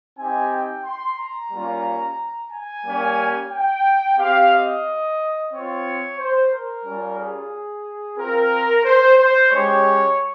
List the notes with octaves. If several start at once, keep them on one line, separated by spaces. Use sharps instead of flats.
C4 D#4 G4 G#5
G5
C6
A#5
G3 A#3 C#4 F4
G#5
G3 A#3 C#4 G4
G5
C4 G4 F5
D#5
C4 F4 C#5
C5
A#4
G3 C#4 F4
G#4
C4 F4 A#4
C5
C5
G#3 C#4 G4 C#5